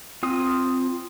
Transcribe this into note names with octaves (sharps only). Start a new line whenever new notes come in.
C4 F4 D#6